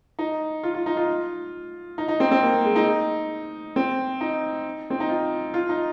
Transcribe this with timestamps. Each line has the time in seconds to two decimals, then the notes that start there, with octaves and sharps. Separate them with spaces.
0.19 D#4
0.63 F4
0.74 F4
0.86 D#4
0.97 F4
1.98 D#4
2.08 D#4
2.20 C4
2.31 C4
2.43 A#3
2.65 G#3
2.76 D#4
3.76 C4
4.21 D#4
4.90 C4
5.00 D#4
5.09 F4
5.54 F4
5.69 D#4